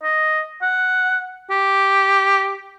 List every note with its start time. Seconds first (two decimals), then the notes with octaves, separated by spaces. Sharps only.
0.03 D#5
0.62 F#5
1.50 G4